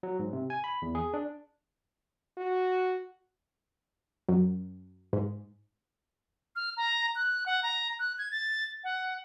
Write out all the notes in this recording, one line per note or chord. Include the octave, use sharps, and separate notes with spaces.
F#3
G#2
C3
G#5
B5
E2
G#4
D4
F#4
F#2
G#2
F6
A#5
F#6
F#5
A#5
F#6
G#6
A6
F#5